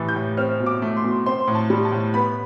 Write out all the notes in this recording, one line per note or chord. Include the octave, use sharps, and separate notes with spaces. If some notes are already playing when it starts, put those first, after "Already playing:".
Already playing: A2 E3 G3 A6
G6
A2
C4 F6
B2
D6
A3
C6
B2
C4 C6
A2
A5
G3
A5
A2
B3 B5